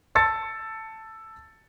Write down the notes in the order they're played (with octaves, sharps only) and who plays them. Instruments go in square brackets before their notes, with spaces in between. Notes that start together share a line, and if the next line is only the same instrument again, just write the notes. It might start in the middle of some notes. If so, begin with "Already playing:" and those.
[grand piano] A5 E6 A6 C#7